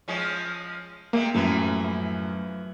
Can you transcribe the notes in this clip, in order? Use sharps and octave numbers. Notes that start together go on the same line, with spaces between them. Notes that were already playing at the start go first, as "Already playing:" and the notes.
F3 G#3 C#4
C3 G#3 A#3
F#2 A2 E3 F3